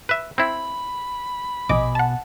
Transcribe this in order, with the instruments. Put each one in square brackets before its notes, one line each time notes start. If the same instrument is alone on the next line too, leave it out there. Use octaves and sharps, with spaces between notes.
[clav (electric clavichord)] B4 E5
[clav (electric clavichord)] C4 E4 [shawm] B5
[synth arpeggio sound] A#1 D#5 D6 [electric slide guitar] B2 G#5
[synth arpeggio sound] F#5 A5